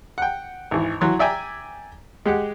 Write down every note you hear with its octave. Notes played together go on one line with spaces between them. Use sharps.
F#5 G5
G#1 E3
E3 F#3 C6
D5 E5 G5 G#5 A#5
G#3 G4 F#5